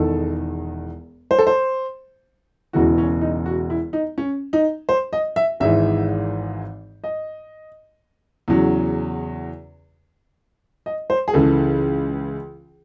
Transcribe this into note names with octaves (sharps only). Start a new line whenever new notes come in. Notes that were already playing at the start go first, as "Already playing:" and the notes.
Already playing: E1 E2 D#3 A4
C5
A4
C5
E1 E2 C#3 E3 F#4
C#4
D#4
F#4
E4
D#4
C#4
D#4
C5
D#5
E5
G#1 G#2 E3 E5
D#5
E2 C#3 F#3
D#5
C5
G#4
C#2 C#3 E3 A4